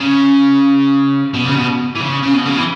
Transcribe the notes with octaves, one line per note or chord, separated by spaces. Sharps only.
C#3
B2
C#3
B2
E3
C#3
C#3
B2
C#3
E3